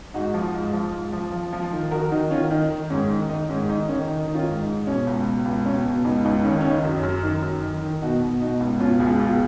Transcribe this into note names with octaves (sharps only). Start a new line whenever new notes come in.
G#2 D#4 F#4
F3
G#2
F3
G#2
F3
F3
F3
D#3
D#3 F#4 A#4
D#3 D#4 F#4
D#3 C#4 F4
D#3 D#4
D#3
G#2 C#4
D#3
D#3 D#4
G#2 C#4
D#3 D#4
D#3 C#4
D#3 D#4
D#3
C#4 F4
G#2
D#4
G#2
B2 C#4
C#2
B2
C#2
B2 C#4
B2
C#2 D#4
C#2 D#4
D#3 C#4
D#3 C#4
D#4
F#2
C#4
F#2
D#3 D#4
F#2
D#3
D#3
B2 D#4 F#4
B2
B2 D#4 F#4
C#2
B2 C#4 F4
C#2 F4 G#4
B2 F4 G#4